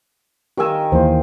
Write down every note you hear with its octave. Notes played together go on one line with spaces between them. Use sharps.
D#3 G4 A#4 G5 G#5 E6
D#2 E3 A#3 C5